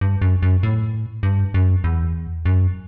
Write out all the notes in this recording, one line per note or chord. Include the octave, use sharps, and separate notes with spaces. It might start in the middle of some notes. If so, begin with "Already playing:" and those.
G2
F#2
F#2
A2
G2
F#2
E2
F#2